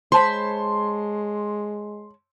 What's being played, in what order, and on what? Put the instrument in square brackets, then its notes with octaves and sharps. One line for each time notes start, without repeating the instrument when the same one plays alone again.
[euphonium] G#3 [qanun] C5 [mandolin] C#5 A5 B5 [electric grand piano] C6